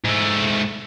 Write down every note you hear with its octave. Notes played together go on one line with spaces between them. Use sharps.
G#2 A3